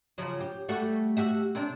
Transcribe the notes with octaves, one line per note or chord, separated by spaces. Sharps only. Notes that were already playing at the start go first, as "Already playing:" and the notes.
C#3 F3 F#3
G4
G3 A3 F#4
F#4 G4 E5
C3 C4 D4